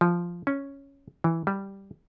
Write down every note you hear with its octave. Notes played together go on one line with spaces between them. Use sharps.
F3
C#4
E3
G3